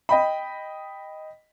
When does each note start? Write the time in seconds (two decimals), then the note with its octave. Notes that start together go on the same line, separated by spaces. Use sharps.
0.09 D#5 G5 B5